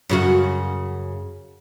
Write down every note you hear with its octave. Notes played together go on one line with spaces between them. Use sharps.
F#2 C#3 F#4